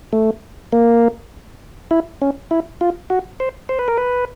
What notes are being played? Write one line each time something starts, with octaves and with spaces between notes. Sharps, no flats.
A3
A#3
E4
C#4
E4
F4
F#4
C5
C5
B4
A#4
B4